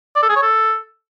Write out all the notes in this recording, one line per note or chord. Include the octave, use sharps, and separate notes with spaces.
D5
A4
G#4
C#5
A4